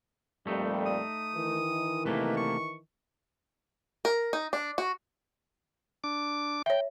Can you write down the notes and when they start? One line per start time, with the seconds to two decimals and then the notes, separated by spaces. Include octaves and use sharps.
0.47 F2 A#2 G3 A3 D#4
0.86 D#6
1.36 D#3 E3
2.05 C3 A3 A#3 B4
2.37 C#6
4.05 A#4
4.33 D#4
4.53 D4
4.78 F#4
6.04 D4 D6
6.66 C#5 E5 G5